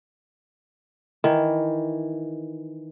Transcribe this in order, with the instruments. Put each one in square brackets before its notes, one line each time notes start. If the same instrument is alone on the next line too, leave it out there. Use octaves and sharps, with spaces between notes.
[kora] D#3 E3